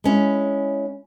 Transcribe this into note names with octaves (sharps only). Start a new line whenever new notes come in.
G#3 C#4 E4